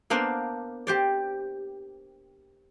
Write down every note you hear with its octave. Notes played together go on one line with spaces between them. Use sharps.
A#3 B3 D4 C5 F5
G4 C5 D5